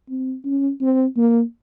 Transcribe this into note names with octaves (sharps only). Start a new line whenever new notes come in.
C4
C#4
C4
A#3